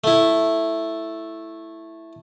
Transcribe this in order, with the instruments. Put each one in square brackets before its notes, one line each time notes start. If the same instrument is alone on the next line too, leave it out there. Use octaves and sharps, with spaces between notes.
[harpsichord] A3 E4